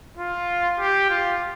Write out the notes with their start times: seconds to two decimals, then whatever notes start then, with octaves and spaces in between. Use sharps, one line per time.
0.17 F4
0.79 G4
1.10 F4